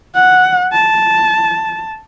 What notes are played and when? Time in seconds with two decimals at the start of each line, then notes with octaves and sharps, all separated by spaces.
0.15 F#5
0.73 A5